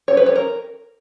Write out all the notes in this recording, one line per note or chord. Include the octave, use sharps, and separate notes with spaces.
C#5
B4
C#5
A#4